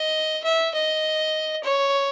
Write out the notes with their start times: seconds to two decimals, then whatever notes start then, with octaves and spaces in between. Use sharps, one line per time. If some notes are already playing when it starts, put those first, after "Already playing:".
Already playing: D#5
0.44 E5
0.74 D#5
1.63 C#5